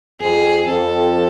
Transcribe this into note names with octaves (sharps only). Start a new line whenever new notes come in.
F2 G#4
F2 A4